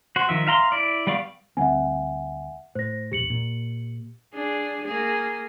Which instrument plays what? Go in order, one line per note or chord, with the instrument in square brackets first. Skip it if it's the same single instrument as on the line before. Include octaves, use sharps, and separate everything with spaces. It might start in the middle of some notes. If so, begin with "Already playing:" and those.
[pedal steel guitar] F#4 C5
D#3 F3 E5
E5 F5 A#5 C6
E4 D5
G3 B3 D5 F5 C#6
[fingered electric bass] D2 G3 C4 [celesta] E5 F#5 G#5
[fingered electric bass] A2 [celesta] C5 A#6
[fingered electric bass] E1 A#1 [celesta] G4 C#7 F#7
[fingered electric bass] A#2
[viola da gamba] D4 G#4
A#3 G#4